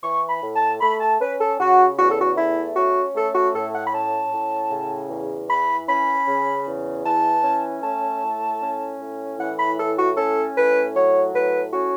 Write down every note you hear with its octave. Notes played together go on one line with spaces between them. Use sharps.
E3 C#6
B5
A2
A5
A3 B5
A5
C#4 B4
A4
C#3 F#4
E2 F#4
A4
F#4
A3 E4
C#4 F#4
A3 A4
F#4
A2 A4
F#5
B5
C#4 A5
A2
C#3
E2
E3 B5
C#4 B5
C#3
E2
E3 A5
C#4
A3 A5
A2
C#4
A2
E3 F#5
B5
A2 A4
F#4
C#4 A4
A2 B4
F#3 C#5
A2 B4
C#4 F#4